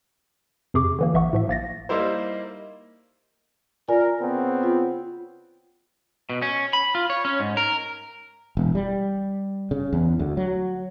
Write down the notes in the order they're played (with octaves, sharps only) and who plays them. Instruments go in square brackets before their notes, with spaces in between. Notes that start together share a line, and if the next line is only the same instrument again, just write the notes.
[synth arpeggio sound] F2 C3 G#4 C#6 D6
D3 E3 A#3
A#1 E3 E5 F#5 C#6
A2 F3 E5
A#1 A#3 A6 A#6
[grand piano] G3 A#3 D#4 E4 C5
[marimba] F4 D5 G#5 [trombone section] A#4
[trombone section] C#3 B3 C4
[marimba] F4
[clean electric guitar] B2
C#4
B5
F4
C#5
C#4
G#2
A#4
[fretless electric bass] E1
G3
C#3
E2
D2
F#3